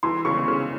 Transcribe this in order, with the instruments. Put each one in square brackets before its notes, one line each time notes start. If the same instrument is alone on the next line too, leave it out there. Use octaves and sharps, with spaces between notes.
[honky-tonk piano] E3 [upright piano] C6
[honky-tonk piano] C#3 [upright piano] C#6
[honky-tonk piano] C#3